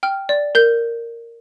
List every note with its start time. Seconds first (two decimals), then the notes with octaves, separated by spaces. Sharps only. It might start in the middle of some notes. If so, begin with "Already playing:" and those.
0.03 G5 F6
0.29 D5
0.55 A#4 G6